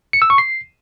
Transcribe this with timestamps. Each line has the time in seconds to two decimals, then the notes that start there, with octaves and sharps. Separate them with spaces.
0.13 C#7
0.22 E6
0.30 C#6
0.38 C7